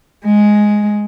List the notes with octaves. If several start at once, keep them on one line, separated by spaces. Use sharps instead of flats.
G#3